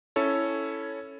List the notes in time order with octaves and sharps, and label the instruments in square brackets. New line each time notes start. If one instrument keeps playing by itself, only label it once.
[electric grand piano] C#4 E4 A4 C#5